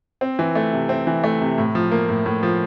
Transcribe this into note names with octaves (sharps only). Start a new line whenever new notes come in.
C4
E3
A3
C3
C4
E3
A3
C3
A2
F3
A#3
A2
A2
F3